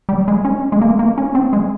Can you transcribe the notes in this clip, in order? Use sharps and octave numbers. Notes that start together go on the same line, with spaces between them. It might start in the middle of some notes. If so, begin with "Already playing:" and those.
G3
G#3
C#4
G#3
A#3
A#3
C#4
C4
G#3